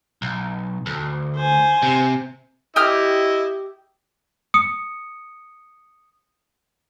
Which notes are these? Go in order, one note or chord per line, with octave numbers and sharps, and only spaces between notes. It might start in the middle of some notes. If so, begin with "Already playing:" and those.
B1
D2
C5 G#5
C3
E4 G4 D#5 D#6 F6
D#6 C#7